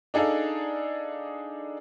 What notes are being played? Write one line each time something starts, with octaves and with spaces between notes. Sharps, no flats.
D4 D#4 G#4 A4 D5 F5